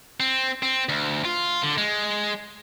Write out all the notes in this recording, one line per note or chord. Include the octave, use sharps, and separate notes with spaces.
C4
C4
D2
F4
D3
G#3